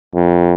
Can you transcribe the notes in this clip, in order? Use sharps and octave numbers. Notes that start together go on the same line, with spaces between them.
F2